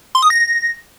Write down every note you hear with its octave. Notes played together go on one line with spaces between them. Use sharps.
C6
D#6
A#6